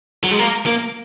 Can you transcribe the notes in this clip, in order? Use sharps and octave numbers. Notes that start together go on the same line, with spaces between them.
F#3
G#3
A#3
A#3